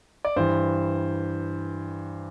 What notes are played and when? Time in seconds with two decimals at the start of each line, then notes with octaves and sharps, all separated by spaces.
0.25 D5
0.36 G2 E3 C5